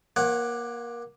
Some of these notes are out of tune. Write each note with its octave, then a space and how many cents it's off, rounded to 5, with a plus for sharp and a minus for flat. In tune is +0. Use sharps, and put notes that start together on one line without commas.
A#3 +25 C#5 -35 F#5 +0